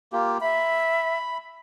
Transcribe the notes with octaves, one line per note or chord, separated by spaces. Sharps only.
A#3 F4 G4
E5 B5